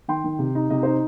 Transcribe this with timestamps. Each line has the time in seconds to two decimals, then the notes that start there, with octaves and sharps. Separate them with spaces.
0.08 D#3 G5 C6
0.24 D#3
0.39 C3
0.55 D#4
0.70 C3 D#5
0.83 D#4 C5